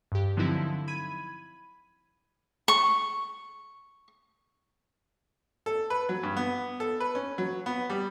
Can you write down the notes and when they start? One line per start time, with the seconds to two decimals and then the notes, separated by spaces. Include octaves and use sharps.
0.12 G2 G4
0.37 D3 F3 F#3 C4 D#4 E4
0.88 B5 G#6 D#7
2.68 C#6
5.66 A4
5.90 B4
6.09 F#3
6.23 G2
6.37 B3
6.80 A4
7.00 B4
7.15 C#4
7.38 F#3
7.66 B3
7.90 G3